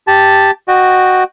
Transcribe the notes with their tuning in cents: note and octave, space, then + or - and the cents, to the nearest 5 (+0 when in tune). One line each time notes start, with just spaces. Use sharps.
G4 +0 A5 +0
F#4 +0 D#5 -30 G5 +0